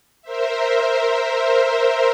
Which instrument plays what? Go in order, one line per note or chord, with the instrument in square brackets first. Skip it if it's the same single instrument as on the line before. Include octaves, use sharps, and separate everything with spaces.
[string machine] A#4 C5 E5